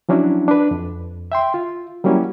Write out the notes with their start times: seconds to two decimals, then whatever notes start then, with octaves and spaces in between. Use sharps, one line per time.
0.09 F3 F#3 C#4 D4 E4 F#4
0.48 D4 B4
0.71 F2
1.32 E5 G5 C6
1.54 F4
2.04 F#3 G3 A#3 C#4 E4